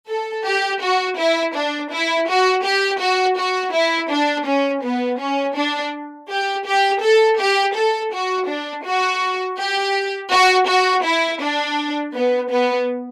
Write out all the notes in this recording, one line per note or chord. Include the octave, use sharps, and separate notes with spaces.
A4
G4
F#4
E4
D4
E4
F#4
G4
F#4
F#4
E4
D4
C#4
B3
C#4
D4
G4
G4
A4
G4
A4
F#4
D4
F#4
G4
F#4
F#4
E4
D4
B3
B3